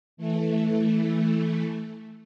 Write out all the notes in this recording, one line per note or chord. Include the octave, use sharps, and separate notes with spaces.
E3 A3